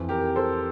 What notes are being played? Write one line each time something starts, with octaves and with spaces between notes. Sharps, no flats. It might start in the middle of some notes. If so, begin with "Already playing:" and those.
Already playing: F2 E3
G4 A#4
A4 C5